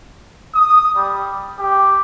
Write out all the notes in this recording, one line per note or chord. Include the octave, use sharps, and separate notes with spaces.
D#6
G3
G4